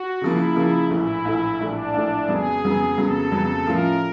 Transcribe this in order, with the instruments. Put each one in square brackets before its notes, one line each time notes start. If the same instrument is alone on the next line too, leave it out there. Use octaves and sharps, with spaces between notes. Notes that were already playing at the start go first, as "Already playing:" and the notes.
Already playing: [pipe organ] F#4
[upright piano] C#3 F3 A#3 [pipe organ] E4
[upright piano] C#3 F3 A#3
[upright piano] A#1 A2 E3 A3 [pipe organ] E4
[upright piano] A#1 A2 E3 A3
[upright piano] A#1 A2 E3 A3 [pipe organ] D4
[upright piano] A#1 A2 E3 A3
[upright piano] F2 C#3 F#3 B3 [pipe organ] G#4
[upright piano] F2 C#3 F#3 B3
[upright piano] F2 C#3 F#3 B3 [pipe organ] A4
[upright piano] F2 C#3 F#3 B3
[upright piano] A2 F3 A3 C#4 F4 [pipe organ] A#4